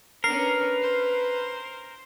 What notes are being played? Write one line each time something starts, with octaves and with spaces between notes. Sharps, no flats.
C#4 D4 A#4 B4 C7
C5